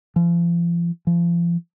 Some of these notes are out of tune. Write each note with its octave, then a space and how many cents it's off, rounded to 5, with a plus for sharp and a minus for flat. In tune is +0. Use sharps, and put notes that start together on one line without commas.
F3 -40
F3 -35